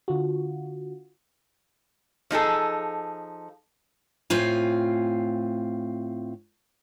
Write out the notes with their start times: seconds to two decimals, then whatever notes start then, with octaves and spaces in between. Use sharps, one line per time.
0.08 D3 F4 F#4
2.31 F3 D#4 G#4 A4
4.30 A2 C4 F4 G#5